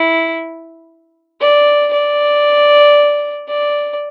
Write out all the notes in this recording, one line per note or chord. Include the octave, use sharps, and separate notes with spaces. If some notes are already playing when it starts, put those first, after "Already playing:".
Already playing: E4
D5
D5
D5